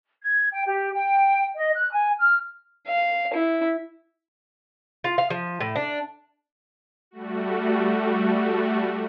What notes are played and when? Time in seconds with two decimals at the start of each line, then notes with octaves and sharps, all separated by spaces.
0.21 G#6
0.51 G5
0.66 G4
0.93 G5
1.56 D#5
1.73 F#6
1.91 G#5
2.18 F6
2.88 F5
3.34 E4
5.04 F4
5.18 F5
5.30 F3
5.60 A2
5.76 D4
7.11 G3 A3 F#4